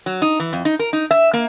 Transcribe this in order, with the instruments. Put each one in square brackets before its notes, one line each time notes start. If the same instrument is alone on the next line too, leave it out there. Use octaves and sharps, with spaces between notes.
[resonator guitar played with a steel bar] F#3
D#4
E3
F2
D#4
A#4
D#4
E5
A#3